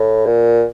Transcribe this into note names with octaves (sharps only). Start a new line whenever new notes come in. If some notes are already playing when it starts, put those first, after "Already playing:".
Already playing: A2
A#2